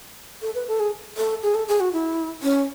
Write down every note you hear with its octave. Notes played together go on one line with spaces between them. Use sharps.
A4
B4
A4
G#4
A4
G#4
A4
G#4
F#4
E4
C#4